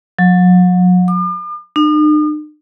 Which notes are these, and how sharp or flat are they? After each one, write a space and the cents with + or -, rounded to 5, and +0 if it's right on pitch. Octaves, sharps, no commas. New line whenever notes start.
F#3 -40
D6 +45
D#4 -45